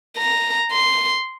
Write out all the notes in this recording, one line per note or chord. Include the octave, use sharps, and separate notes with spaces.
A#5
C6